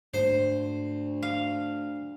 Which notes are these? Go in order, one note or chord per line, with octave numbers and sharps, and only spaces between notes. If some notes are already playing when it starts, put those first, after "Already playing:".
D2 G#2 C5
F5